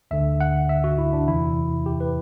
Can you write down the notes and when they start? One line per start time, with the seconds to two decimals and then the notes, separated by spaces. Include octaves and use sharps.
0.11 D2 D3 E5
0.41 F#5
0.69 E5
0.84 F#4
0.98 E4
1.13 D4
1.28 E2 C3 E3 E4
1.86 G4
2.00 B4